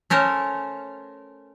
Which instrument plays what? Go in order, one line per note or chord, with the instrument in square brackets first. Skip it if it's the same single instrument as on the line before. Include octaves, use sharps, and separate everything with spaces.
[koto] A3 C#4 A#4 C5 C#5